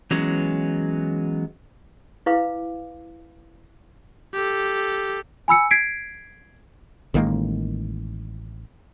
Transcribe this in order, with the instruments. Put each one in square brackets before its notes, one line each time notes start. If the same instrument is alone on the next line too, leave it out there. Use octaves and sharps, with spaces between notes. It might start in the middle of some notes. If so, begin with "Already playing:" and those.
[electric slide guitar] E3 F#3 G#3 B3 C#4
[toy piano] E4 B4 F5 D6
[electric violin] G4 A4
[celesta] G#5 B5 E6 C#7
G#6 B6 C7 D7
[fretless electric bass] A1 D#3 G#3 A#3